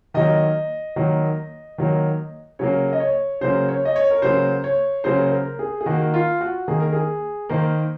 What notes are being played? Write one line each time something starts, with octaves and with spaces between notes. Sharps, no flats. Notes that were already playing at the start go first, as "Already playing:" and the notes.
D#3 F#3 A#3 D#5
D#3 F#3 A#3
D#3 F#3 A#3
C#3 F#3 A#3 C#5
D#5
C#5
C#3 F#3 A#3 C5
C#5
D#5
C#5
A#4
C#3 F#3 A#3 C5
C#5
C#3 F#3 A#3 C5
C5
A#4
G#4
G#4
D#3 A#3 F#4
F4
F#4
D#3 A#3 G#4
A#4
G#4
D#3 A#3 C5